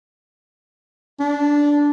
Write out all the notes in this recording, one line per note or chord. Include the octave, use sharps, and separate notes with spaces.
D4